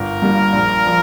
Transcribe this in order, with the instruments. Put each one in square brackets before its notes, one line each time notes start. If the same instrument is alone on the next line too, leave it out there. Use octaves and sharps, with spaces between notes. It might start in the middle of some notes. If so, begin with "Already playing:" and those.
Already playing: [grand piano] G1 [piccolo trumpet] A#4
[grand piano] G2 G3 A#3
A#1
F3